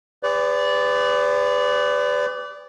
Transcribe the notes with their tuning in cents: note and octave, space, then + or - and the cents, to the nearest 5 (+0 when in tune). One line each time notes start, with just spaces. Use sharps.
G#4 -45 B4 +35 D5 -15